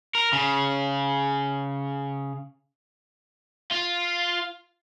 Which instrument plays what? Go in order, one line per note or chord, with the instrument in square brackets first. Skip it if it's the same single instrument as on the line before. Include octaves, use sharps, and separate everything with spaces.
[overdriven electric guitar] A#4
C#3
F4